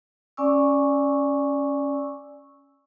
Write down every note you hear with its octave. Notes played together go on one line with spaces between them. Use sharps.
C#4 D5 G#5 C#6 D6 E6